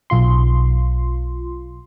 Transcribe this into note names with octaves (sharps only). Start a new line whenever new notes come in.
B1 F4 C6